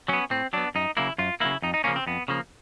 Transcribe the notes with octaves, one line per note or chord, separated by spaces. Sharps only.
F#3 B3 C#4
A2 C4
F#3 B3 D4
F#2 D#4
C#3 F#3 A#3 E4
F#2 F4
C#3 F#3 A#3 E4
F2 D#4
D#4
C#3 F3 A#3 C#4
C4
F2 B3
C#3 F3 A#3